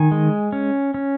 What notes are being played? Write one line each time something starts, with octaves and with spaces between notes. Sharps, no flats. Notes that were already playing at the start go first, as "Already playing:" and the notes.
Already playing: D#3 G#5
G#3
C#4
C#4